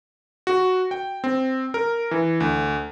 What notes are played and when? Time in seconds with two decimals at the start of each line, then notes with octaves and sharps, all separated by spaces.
0.47 F#4
0.91 G5
1.24 C4
1.74 A#4
2.11 E3
2.40 D2